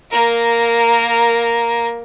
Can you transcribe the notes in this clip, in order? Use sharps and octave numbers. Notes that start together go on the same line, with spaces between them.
A#3 A#4